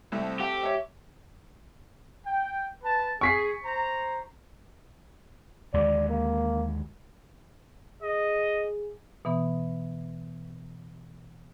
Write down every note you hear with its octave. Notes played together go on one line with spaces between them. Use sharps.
C2 A3 C4 A4
G4 F#5
C#5 E5
G5
B4 A5
G#4 C#6 B6 C7
C5 A#5
D#2 D3 G#3 D5
A#3
G#4 D#5
B2 E3 B3 D#6